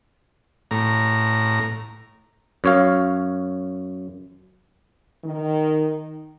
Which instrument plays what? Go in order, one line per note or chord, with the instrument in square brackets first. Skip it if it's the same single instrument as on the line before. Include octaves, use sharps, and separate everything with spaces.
[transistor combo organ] A2 A#5
[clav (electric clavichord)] F#2 C#5 F5
[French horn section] D#3